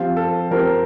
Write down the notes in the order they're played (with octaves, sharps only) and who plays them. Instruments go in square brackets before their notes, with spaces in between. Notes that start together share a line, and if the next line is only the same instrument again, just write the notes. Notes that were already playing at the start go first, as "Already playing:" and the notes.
Already playing: [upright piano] F3 C4 G4 C5 [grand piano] F4
[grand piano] A4
[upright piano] F3 C4 G4 C5 [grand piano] A#4